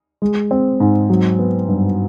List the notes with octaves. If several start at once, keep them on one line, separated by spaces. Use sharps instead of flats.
G#3
C4
G#2
F#3
B3
G2